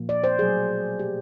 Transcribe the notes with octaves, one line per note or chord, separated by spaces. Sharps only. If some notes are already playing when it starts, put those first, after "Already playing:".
Already playing: A#2 F3 A#3
D5
C5
B2 F#3 A3 G#4
B2 F#3 A3 G4